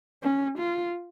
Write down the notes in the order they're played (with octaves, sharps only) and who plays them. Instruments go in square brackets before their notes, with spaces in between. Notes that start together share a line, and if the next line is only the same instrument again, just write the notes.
[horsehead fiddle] C#4
F4